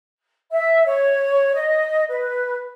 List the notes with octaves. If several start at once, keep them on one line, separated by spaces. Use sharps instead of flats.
E5
C#5
D#5
B4